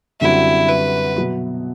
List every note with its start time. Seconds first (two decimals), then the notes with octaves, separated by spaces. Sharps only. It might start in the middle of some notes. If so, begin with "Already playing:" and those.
0.21 F#2 D3 G3 C4 E4 F#4
0.68 B4
1.16 B2 F#3 B3 F#4